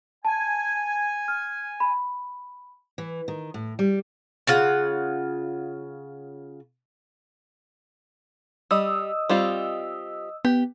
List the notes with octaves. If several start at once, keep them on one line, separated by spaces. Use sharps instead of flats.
G#5 A5
F6
B5
E3
D#3
A2
G3
C#3 F4 F#5
G3 D#5 D#6 E6
G3 C4 F4
B3 G4